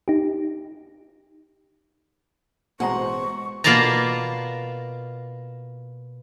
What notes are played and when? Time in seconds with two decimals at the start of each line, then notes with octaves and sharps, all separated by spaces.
0.08 D#4 G4
2.80 A1 B2 G#3 C5 F#5 A#5 C#6
3.64 B2 A#3 F4 D5 A5 A#5